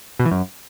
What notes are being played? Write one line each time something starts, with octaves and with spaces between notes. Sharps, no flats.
B2
E3
F#2